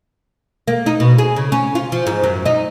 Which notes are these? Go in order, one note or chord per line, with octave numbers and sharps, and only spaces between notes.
A#3
D#4
B2
G#4
C#3
C#4
F4
F3
G#2
F#2
D#4